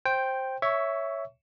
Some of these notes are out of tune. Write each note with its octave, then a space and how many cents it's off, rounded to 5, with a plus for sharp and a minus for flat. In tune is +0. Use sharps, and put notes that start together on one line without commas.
C5 +10 G5 +0
C#5 +0 E5 +0 C#6 +20